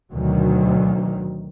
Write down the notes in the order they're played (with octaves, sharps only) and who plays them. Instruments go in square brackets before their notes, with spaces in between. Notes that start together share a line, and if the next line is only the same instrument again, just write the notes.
[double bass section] D2 B2 D#3 F#3